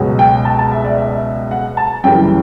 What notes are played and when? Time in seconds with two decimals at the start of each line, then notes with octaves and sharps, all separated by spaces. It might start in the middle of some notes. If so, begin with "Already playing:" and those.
Already playing: C#2 B2 F#3
0.19 G5
0.45 A5
0.59 A5
0.71 E5
0.85 D5
0.98 E5
1.51 F#5
1.77 A5
2.04 F#1 F#2 C#3 E3 G3 G5